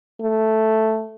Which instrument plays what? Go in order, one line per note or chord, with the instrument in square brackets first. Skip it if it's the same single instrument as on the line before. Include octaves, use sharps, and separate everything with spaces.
[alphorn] A3